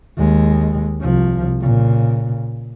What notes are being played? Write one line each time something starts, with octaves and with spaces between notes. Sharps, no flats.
D#2 G#3
C2 F3
A#2 C#3